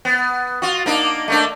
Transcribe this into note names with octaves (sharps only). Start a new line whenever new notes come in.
B3
F4 F#4
A#3 D4 D#4
A3 A#3 D4